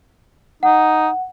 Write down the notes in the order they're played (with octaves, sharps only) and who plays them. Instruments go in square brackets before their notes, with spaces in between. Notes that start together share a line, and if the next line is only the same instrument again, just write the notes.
[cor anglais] D#4 [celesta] F#5